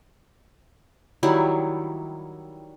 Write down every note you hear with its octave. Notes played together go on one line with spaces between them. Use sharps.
D#3 F#3 G3 E4